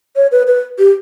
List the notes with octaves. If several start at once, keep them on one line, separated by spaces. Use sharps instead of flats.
C#5
B4
B4
G4